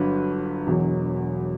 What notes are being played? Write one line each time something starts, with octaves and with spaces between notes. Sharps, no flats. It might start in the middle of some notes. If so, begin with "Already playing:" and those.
Already playing: G1 G2 F#3 B4
E1 E2 B2 F#3